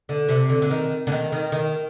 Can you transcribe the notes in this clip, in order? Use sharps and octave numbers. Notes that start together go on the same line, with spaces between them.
D3
C3
D3
D3
D#3
D3
D#3
D#3
D#3